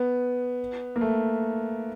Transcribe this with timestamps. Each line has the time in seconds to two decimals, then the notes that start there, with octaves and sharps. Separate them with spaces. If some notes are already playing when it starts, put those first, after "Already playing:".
Already playing: B3
0.96 A#3
1.01 A3